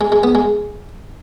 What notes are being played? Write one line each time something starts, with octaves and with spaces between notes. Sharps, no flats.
G#3
G#3
B3
G#3